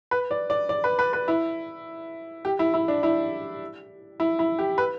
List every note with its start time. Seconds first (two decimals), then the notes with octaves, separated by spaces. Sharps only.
0.11 B4
0.31 D5
0.50 D5
0.69 D5
0.84 B4
0.99 B4
1.13 B4
1.28 E4
2.45 G4
2.59 E4
2.74 E4
2.88 D4
3.03 E4
4.20 E4
4.39 E4
4.59 G4
4.78 B4